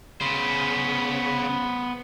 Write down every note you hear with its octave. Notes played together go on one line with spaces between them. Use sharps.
C#3 B3 C5 B5